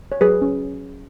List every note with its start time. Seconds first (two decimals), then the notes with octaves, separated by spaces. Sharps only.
0.12 C#5
0.21 F#3 G#4 B4
0.42 C#4